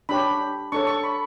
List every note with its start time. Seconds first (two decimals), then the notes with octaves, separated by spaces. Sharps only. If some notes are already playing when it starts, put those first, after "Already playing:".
0.09 D4 G4 C#5 B5
0.72 D4 A4 C#5 C#6
0.87 C#6
1.03 B5